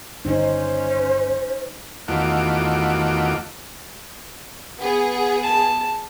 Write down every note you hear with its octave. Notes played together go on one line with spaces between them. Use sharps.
G1 G2 C#4 D#4 C5
E2 D#3 A3 F4 F#4 D6
B3 G#4
A5